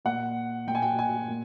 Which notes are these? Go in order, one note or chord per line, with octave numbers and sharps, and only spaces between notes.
A#2 F#5
A#2 G5
G#5
G5
G#5
A#2